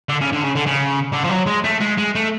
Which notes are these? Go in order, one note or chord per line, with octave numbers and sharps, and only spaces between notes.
D3
C#3
D3
C#3
D3
C#3
D3
F3
F#3
G#3
A3
G#3
G#3
A3